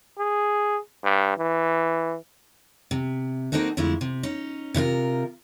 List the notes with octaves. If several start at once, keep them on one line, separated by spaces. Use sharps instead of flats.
G#4
G2
E3
C3
A#3 C4 D#4 F#4 A4
F2 D3 G#3 A3 E4
C3
C#4 D#4
C3 E4 F4 A#4